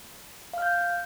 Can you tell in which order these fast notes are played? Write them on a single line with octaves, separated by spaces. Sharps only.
F5 F6 G6